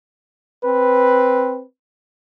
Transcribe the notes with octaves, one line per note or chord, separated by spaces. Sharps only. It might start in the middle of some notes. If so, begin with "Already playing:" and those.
C4 B4